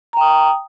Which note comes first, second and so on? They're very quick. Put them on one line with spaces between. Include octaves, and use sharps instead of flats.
A#5 G5 D#6